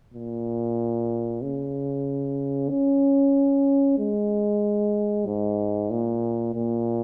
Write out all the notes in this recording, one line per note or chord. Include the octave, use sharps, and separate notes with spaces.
A#2
C#3
C#4
G#3
G#2
A#2
A#2